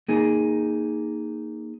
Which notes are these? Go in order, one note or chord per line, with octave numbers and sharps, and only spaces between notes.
A#3 D#4 G#4